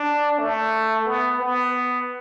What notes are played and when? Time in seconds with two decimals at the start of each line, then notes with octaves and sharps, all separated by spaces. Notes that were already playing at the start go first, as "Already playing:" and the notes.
Already playing: D4
0.39 A3
1.06 B3
1.40 B3